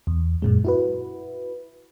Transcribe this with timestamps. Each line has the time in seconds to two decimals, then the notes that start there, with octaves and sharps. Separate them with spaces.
0.07 E2
0.42 F#2 A#2 G#3
0.65 E4 F#4 B4